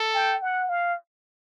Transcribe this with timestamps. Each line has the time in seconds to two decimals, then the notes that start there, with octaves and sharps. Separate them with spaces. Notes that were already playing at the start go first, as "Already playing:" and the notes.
Already playing: A4
0.14 G5
0.42 F#5
0.70 F5